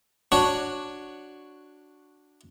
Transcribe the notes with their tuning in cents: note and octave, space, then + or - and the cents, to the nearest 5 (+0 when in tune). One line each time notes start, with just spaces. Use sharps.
D4 +0 F#4 +0 C#5 +0